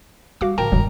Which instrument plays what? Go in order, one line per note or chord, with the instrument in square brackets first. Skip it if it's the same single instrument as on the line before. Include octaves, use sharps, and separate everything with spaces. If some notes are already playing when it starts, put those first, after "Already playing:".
[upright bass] G3 [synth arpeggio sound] F#4 F5 D6
[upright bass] A2 D3 [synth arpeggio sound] F3 G5 A5 [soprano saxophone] A#4
[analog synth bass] F1 [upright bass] G2 G#3 [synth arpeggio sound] D#3 F#3